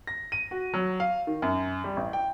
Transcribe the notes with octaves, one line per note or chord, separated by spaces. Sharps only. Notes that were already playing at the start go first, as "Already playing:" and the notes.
A#6
D#7
F#4
F#3
F5
D#3
F#2
G3
A1
G5